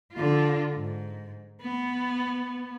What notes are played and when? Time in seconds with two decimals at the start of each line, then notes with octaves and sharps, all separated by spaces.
0.13 D3 F4
0.75 G#2
1.61 B3